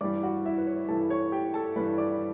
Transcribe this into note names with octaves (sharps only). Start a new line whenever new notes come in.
G2 E3 G3 D5 D6
F#4 F#5
E4 E5
B4
C#5
G2 E3 G3 A4 A5
C#5 C#6
G4 G5
A4 A5
G2 E3 G3 B4 B5
D5 D6